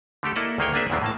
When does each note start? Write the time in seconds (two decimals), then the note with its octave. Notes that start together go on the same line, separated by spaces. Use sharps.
0.23 D3 A3 G4 A4
0.36 A#3 E4 A4 D5 D#5 F#5
0.58 D2 D#3 A#3 G#4 C#5 G5
0.73 A#3 C4 D4 G#4 B4 E5
0.90 E2 A#2 D#3 E3 B3 C4
1.02 A2 A#3 A5